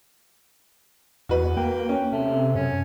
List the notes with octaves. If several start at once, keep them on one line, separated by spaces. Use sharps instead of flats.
E2 F#4 B4
A#3 G5
C#4
C3 A3
F#2 C#4